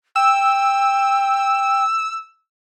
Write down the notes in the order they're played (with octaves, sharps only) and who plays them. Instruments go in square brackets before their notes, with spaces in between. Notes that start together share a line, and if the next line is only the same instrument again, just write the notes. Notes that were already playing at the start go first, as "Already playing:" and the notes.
[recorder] G5 [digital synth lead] E6